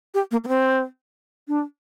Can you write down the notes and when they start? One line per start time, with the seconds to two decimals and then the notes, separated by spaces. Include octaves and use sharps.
0.14 G4
0.31 A#3
0.44 A#3
0.48 C4
1.48 D4